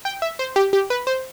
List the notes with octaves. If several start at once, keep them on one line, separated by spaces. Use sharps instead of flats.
G5
E5
C5
G4
G4
B4
C5